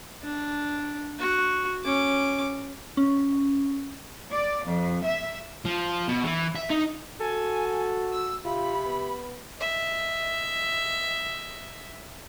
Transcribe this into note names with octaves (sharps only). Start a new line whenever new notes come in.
D4
F#4
C#4 D6
C#4
D5
F2
E5
F3
B2
E3
E5
D#4
F#4 A4 G#5
E6
C3 F4 B5
B3
D#5 E5